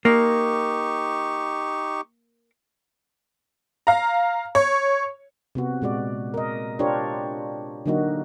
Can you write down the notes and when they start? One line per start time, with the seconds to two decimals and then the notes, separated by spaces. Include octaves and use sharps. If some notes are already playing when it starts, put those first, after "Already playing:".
0.05 A#3 D#4 G4 C#6
3.87 F5 A#5
4.55 C#5
5.55 C3 B3 F#4
5.82 A#2 G#3 F#4 D5
6.34 A#4 D#5
6.79 D4 F4 G4 A#4 C5 C#5
7.86 D3 F#3 A#3 D#4 F#4